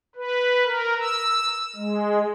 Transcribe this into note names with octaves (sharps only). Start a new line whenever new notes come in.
B4
A#4
E6
G#3